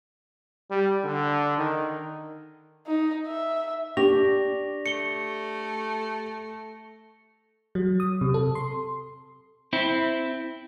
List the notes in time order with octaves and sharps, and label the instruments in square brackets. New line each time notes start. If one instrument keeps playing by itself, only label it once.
[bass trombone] G3
D3
D#3
[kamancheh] D#4
E5
[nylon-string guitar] D4 [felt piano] G4 [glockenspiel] C#6 A#6 F7
[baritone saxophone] A3 [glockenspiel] C#7 G7
[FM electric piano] F#3
D#6
C3
A4
C6
[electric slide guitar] C4 E4